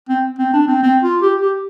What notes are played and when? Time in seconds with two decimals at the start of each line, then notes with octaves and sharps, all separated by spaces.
0.09 C4
0.39 C4
0.53 D4
0.68 C4
0.83 C4
1.02 F4
1.22 G4
1.41 G4